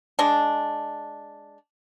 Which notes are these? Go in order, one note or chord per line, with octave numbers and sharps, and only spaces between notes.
G#3 D4